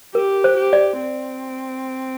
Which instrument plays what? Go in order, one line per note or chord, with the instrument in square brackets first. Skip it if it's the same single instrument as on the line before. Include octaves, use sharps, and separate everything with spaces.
[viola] G4 [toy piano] A#4
[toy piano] C5
[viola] G4
[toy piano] D5
[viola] C4